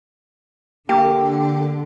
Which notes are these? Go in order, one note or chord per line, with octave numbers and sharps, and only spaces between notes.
D3 A#3 G4